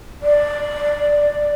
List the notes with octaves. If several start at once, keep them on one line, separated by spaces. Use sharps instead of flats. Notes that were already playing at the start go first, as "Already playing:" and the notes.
D5